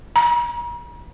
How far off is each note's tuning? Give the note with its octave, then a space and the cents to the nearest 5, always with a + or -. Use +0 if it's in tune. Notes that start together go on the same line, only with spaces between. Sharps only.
A#5 +45